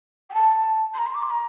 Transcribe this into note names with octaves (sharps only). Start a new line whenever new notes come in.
G5
A5
C6
A#5
C6
D6
C6
A#5